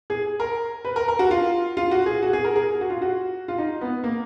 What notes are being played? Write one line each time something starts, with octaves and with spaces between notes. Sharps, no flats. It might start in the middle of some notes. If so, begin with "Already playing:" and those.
G#4
A#4
B4
A#4
A#4
F#4
F4
F4
F#4
G#4
F#4
G#4
A#4
G#4
F#4
F4
F#4
F4
D#4
B3
A#3